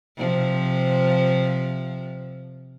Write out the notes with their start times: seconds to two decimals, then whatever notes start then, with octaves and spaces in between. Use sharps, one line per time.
0.16 C3 F3